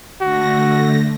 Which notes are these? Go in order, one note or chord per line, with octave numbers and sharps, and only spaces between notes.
D3 A3 F#4 A#6